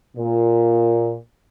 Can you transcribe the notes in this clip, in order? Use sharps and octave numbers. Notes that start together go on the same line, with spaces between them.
A#2